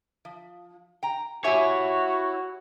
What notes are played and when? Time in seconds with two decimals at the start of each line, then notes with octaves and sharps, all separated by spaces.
0.25 F3
1.03 G5 A#5
1.44 E4 F#4 G4 C#5 E5 G#5